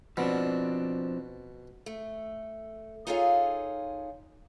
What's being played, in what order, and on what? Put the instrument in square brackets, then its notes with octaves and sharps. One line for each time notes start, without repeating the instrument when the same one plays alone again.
[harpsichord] B2 [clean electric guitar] F3 C4 D4
[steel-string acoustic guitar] A3
D#4 F4 G#4 A4 C#5 F5